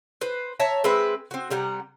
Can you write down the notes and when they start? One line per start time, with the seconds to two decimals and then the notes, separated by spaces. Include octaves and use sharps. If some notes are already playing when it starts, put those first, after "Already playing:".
0.21 B4 C5
0.60 C#5 E5 A5 A#5
0.84 G#3 C4 B4 E5
1.31 C4 F#4
1.50 C3 G3 F#5 A#5